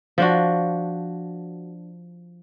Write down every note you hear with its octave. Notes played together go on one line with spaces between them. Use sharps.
F3 D4 F#4